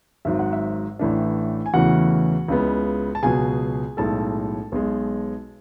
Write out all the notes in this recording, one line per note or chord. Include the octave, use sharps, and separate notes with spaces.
G#1 G#2 F#3 E5
F#5
E5
A1 A2 E3 A3 D4
G#5
E2 C#3 E3 A3 C#4 F#4 F#5
C#2 C#3 G#3 B3 E4
A5
C#2 B2 F#3 G#4 G#5
B1 A2 G#3 A4 A5
B1 B2 G#3